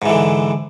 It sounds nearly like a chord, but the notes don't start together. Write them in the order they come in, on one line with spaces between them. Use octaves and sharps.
G#2 E3 D3